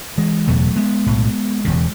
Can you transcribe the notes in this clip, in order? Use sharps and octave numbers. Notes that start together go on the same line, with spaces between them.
E3 G#3
F#1 E2 B2 F#3 A3
G#3 B3
B1 A2
E1 E2 C#3